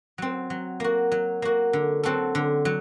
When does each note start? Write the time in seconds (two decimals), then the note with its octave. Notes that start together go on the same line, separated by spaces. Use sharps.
0.18 F#3 C4
0.50 F#3
0.80 A#3 F#4
1.12 F#3
1.42 A#3 F#4
1.73 D3
2.03 F#3 C4 F#4 A4
2.35 D3
2.65 F#3